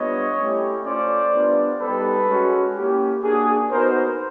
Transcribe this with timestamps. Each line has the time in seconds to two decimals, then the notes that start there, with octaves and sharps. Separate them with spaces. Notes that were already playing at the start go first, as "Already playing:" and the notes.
Already playing: G3 B3 D4 F4 C#5 D#5
0.37 A3 C#4 E4 G4
0.85 A3 C#4 F4 C5 D5
1.33 G3 B3 D4 F4
1.80 G3 B3 D#4 G4 A4 B4
2.27 G#3 C#4 F#4
2.75 A#3 C#4 E4 G4
3.22 A#3 D4 F#4 G#4
3.70 B3 D#4 F#4 A#4 C5